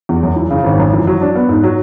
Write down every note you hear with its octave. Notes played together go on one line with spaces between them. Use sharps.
E2
F#2
E3
C#3
G#1
F#2
E3
F#3
D4
B3
G#2
F#3